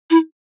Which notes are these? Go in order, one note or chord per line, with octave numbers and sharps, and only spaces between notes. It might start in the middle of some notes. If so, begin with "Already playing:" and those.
E4